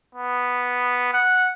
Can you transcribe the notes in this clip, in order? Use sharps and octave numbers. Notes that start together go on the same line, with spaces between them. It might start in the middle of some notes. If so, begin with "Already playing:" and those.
B3
F#5